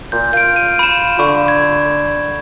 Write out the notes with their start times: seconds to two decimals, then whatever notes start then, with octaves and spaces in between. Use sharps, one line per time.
0.12 A#2 G6
0.33 F4 G6 D7
0.56 D#7
0.79 B5 E7
1.19 D3 B5 C#6
1.48 G#6